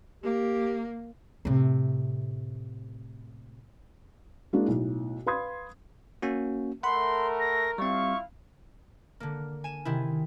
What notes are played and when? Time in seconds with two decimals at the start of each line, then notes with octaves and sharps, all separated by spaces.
0.24 A#3 G4
1.45 A2 C3
4.53 G#3 A#3 D4 E4 F#4 G#4
4.68 B1 A2
5.26 B4 F5 B5 C6 D#6 G#6
6.22 A#3 C#4 F#4
6.83 A3 A#4 F#5 B5 C6
7.40 A#6
7.78 G3 C4 E4 F4 F5 C#6
9.20 D3 A#3
9.64 G#5 E7
9.85 C3 D#3 E4